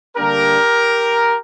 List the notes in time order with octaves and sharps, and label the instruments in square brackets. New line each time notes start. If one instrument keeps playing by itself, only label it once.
[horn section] D3 G3 A#3 D4 G4 A#4